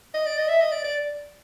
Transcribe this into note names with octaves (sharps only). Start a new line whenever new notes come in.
D#5
D5
D#5
E5
D#5
D5
D5